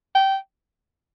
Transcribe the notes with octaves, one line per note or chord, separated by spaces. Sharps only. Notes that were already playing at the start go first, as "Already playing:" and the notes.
G5